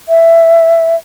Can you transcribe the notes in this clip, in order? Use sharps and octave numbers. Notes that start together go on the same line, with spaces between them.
E5